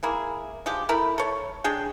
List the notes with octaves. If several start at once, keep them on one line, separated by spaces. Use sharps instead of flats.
A#3 E4 G#4
F3 G#3 D4 G4
A3 E4 A#4 B5
A4 C#5
G#3 D4 G#4 G5